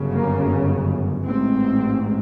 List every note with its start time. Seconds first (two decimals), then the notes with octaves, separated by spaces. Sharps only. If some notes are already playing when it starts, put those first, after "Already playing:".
Already playing: G1 F#2 C#3
0.13 A#3
1.24 A1 G#2 C4